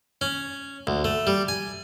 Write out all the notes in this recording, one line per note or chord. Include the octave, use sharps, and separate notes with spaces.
C#4
D2
A3
G3
G#5